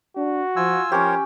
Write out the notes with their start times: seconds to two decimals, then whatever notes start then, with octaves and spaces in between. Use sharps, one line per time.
0.17 D4 F#4
0.56 F3 F4 G#5 E6
0.92 F3 C#4 G4 A#4 C5 C#5